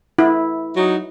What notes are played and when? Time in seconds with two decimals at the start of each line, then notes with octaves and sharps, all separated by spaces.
0.18 E4
0.76 F#3 D#4